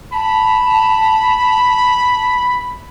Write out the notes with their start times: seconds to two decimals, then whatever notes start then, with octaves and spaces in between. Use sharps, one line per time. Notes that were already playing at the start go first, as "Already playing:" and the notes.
0.13 A5 B5